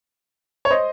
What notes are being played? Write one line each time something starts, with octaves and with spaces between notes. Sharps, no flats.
C#5
C5 D#5